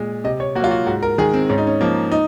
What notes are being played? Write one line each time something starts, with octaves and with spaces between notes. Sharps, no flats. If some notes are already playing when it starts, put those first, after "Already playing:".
Already playing: A#2 G#3
C3 D#5
C#5
F#3 A#3 F4 F#4
F#4
G#2 F#4
A#4
D#3 G#3 G#4
C4
G#2 C#4
D#4
C#4
F3 A#3
D#4